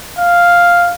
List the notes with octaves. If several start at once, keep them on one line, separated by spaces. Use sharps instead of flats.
F5